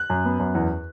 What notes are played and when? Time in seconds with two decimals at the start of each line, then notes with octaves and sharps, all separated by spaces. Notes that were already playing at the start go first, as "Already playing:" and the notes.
Already playing: F#6
0.10 F#2
0.25 B3
0.40 F#2
0.55 E2